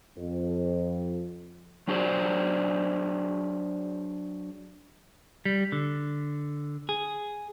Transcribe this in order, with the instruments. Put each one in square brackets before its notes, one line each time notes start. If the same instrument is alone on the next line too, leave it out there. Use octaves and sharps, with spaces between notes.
[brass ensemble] F2
[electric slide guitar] F#3 D4 F#4 G#4 C5 D5
[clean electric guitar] G3
D3
G#4